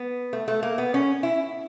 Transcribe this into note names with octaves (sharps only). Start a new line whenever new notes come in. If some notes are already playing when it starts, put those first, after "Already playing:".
Already playing: B3
A3
A3
A#3
B3
C#4
E4